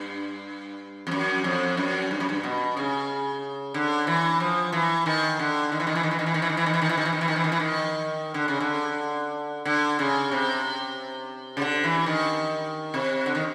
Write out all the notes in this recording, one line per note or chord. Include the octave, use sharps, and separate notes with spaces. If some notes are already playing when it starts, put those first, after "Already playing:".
Already playing: G2
F2
F#2
F2
F#2
G2
F#2
G2
B2
C#3
D3
E3
F3
E3
D#3
D3
D#3
E3
D#3
E3
D#3
E3
D#3
E3
D#3
E3
D#3
E3
D#3
E3
D#3
E3
D#3
E3
D#3
E3
D#3
E3
D#3
E3
D#3
D3
C#3
D3
D3
C#3
C3
C#3
D3
E3
D#3
C3
D3
D#3